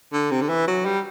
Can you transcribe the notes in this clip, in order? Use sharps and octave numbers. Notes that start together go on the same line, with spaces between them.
D3
C3
D3
E3
F#3
G3